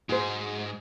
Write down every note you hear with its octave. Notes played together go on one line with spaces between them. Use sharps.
G#2 F#4 G#4 C5